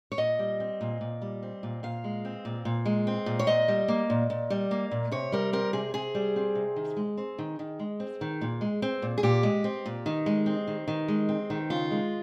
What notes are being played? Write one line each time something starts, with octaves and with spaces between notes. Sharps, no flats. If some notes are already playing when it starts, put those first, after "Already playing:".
C#5
A#2 D#5
G3
C4
A#2
A#2
G3
C4
A#2
A#2 F5
G#3
C4
A#2
A#2
G#3
C4
A#2
C#5
A#2 D#5
G3
A#3
A#2
A#2
G3
A#3
A#2
C3 C#5
G3 A#4
C4 A#4
C3 G#4
C3 G#4
G3
C4
C3
D#3
G#3
C4
D#3
D#3
G#3
C4
D#3
A#2
G#3
C4
A#2
G#4
A#2 G4
G#3
C4
A#2
D#3
G#3
C4
D#3
D#3
G#3
C4
D#3
C#3 F4
G#3